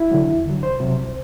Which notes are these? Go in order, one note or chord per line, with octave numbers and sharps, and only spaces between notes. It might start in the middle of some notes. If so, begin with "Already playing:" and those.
Already playing: E4
D3 F#3
E2
D3 F#3
C2 C5
C3 F#3
C2